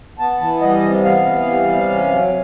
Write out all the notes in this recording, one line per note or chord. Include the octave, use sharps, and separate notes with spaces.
B3 A5
E3
G3 D#5
C3
B3 F5
E3
G3
C3
C#4
F#3